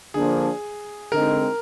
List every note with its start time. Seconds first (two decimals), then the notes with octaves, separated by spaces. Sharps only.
0.14 D3 F3 A#3 D4 G#4
1.12 D3 G#3 C4 D#4 A#4